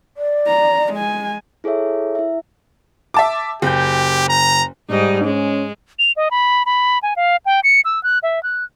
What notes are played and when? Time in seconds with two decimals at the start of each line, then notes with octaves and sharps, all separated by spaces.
0.17 D5
0.47 A#5
0.93 G#3 G#5
1.64 E4 G#4 A4 C#5 E5
2.15 E4 E5
3.14 E5 A5 D6
3.62 F#1 G4 G6
4.29 A#5
4.89 G#2 G3 D#4
5.24 G#3 C#4
5.99 F7
6.17 D#5
6.31 B5
6.66 B5
7.03 G#5
7.16 F5
7.46 G5
7.64 C#7
7.85 E6
8.03 F#6
8.23 E5
8.43 F#6